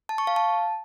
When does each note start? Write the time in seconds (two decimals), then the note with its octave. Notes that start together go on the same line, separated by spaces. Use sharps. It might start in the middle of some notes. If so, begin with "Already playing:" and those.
0.09 A5
0.18 C#6
0.27 F5
0.36 A5